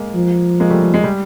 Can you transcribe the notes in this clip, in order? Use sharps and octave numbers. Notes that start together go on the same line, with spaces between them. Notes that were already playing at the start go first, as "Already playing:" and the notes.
Already playing: G#3 A#3
F3
G#3 A#3
G3 A3
G3
G#3
G3